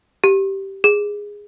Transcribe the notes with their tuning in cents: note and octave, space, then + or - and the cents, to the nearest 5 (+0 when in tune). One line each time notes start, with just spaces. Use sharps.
G4 -10
G#4 -10